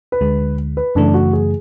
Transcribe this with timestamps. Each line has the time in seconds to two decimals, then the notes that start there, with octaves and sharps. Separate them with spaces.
0.12 B4
0.21 D2 D3 G#3
0.77 B4
0.95 F#2 C#3 E3 A3 D4
1.14 F#4
1.33 G#4